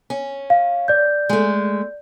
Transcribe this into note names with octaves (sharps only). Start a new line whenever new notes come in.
C#4
F5
D5 G6
G#3 A3